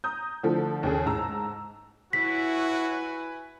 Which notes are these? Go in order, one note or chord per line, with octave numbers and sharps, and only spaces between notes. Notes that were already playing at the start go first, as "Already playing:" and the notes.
A#5 D#6 G6
D3 F3 A3 A4
D#2 C#3 G#4
G#2 A5 A#5 E6
E4 F#4 B4 C#5 G#5 B6